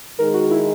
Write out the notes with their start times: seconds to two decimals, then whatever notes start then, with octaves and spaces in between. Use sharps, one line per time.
0.18 D#3 G#3 D#4 G#4 A#4
0.34 F#4
0.51 E4